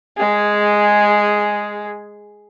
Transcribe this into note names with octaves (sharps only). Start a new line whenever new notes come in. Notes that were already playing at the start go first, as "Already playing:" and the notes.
G#3 G#4